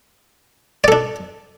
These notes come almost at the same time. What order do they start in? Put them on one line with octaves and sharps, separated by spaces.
D5 A4 D4